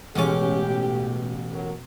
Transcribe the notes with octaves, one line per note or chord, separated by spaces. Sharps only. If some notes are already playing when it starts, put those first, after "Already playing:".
A1 B2 G#3 C#4 G4 D6
F#3 A#4